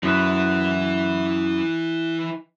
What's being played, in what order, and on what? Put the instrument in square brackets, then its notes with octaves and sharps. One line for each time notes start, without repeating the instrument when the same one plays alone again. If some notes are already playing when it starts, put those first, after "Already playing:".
[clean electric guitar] F#2 B3 B4 [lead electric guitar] E3 E4